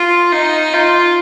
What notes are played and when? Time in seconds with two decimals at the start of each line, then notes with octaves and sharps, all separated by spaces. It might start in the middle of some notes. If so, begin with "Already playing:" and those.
Already playing: F4
0.33 D#4
0.73 F4